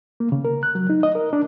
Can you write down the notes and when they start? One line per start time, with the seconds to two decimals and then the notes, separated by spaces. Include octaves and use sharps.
0.20 A#3
0.32 C#3
0.45 A#4
0.63 F#6
0.75 F#3
0.90 D#4
1.03 D#5
1.15 A#4
1.33 D4